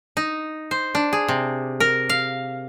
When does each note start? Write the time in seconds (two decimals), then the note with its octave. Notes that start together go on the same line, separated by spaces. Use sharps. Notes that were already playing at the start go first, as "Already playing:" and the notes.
0.17 D#4
0.71 C5
0.95 D4
1.13 G#4
1.28 C3
1.80 A#4
2.09 F5